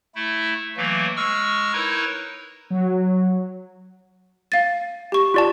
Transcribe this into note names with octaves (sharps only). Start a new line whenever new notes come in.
A3 E4
E3 F#3 A3 A#3
G#3 C#6 E6 F6
D#4 E4 A#4 B4 C#5
F#3
F5 A6
G4 C#6
F4 D5 A5